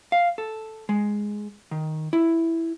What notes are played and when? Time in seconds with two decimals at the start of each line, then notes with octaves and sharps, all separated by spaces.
0.12 F5
0.38 A4
0.89 G#3
1.71 D#3
2.13 E4